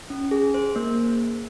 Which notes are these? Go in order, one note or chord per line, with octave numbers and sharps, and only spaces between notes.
C#4
G#4
C5
A#3